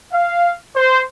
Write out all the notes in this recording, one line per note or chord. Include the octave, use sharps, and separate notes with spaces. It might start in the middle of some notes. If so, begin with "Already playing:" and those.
F5
C5